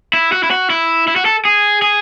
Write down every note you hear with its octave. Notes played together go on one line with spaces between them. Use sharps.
E4
F#4
E4
F#4
E4
E4
F#4
A4
G#4
G#4